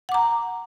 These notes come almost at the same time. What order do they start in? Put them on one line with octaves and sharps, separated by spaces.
F#5 D6 A#5